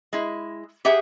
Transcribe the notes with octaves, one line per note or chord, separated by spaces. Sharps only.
G#3 E4
G4 G#4 E5 F#5